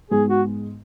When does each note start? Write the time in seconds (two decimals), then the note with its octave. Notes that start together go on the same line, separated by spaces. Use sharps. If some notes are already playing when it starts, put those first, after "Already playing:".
0.10 G#2 G#3 B3 G#4
0.29 F#4